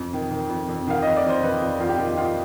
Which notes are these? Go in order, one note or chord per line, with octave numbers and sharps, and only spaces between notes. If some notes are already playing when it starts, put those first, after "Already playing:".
Already playing: F2
D#3
D#3
F2
F2
D#3 F5
F2 D#5
D5
F2 C5
D#3 B4
F2
F2 F4
G4
D#3 F4
D#3 F4